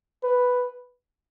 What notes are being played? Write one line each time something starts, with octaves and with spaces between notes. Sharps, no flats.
B4